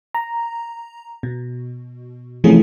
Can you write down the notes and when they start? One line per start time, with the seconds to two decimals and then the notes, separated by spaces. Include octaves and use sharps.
0.15 A#5
1.23 B2
2.44 C3 E3 F3 A3 C#4 G#4